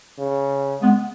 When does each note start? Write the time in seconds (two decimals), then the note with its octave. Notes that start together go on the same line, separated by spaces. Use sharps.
0.19 C#3
0.82 G#3 B3